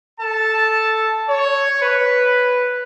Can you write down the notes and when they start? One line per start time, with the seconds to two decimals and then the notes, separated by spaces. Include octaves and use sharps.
0.20 A4 A5
1.29 C#5
1.81 B4